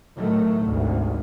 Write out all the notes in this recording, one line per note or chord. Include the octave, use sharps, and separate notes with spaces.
A2 D#3 F#3 A3
G#1 D2 C3